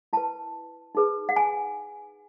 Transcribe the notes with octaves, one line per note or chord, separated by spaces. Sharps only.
E4 B4 A5
D#4 G#4 B4
F#5
G#5